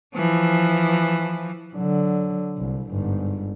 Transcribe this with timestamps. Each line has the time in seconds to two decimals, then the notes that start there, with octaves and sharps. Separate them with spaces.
0.15 E3 F3
1.74 D3 F#3
2.58 C2
2.91 G1 G#2